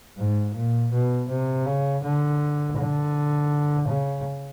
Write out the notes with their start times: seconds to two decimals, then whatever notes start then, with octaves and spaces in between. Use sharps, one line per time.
0.18 G#2
0.55 A#2
0.92 B2
1.29 C3
1.66 C#3
2.03 D3
2.78 D3
3.88 C#3